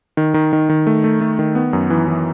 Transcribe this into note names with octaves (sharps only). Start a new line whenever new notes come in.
D#3
D#3
D#3
D#3
A3
A3
A3
D#3
B3
F#2
E3
E3